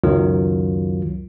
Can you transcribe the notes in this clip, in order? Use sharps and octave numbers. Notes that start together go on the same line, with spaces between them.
C#2 F#2 D#3 F#3 F4